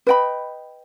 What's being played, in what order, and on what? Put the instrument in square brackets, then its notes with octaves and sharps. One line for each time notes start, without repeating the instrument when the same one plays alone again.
[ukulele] B4 D#5 G5 B5